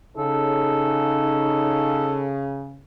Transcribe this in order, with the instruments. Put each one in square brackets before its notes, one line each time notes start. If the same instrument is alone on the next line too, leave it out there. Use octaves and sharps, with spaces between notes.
[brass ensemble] C#3 [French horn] D#4 [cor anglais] A4